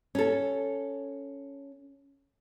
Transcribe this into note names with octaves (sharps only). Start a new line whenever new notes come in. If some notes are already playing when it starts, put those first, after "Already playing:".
C#4 A4